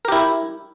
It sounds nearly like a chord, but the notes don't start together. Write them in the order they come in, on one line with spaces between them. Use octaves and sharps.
A#4 G4 E4